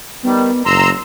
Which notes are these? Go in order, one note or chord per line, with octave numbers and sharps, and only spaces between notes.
D#3 G3 B3
F#1 A#5 C6 E6